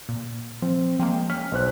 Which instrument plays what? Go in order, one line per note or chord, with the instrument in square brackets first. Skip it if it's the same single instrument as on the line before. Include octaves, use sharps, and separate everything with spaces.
[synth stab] A#2
[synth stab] F3 [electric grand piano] C4
[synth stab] F3 G#3 A#3 [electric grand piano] G5
[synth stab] C#4 [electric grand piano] F6 B6
[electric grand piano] B1 C5 F#6